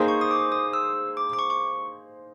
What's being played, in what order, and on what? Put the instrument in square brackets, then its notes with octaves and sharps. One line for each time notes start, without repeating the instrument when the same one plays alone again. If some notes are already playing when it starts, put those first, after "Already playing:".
Already playing: [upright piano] A#3 D#4 G#4 C5
[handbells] C#6
D#6
D6
D#6
E6
D6
D6
C#6
C#6